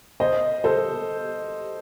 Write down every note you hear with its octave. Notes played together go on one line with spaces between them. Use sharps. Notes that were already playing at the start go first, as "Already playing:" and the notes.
C5 D#5
A4 C5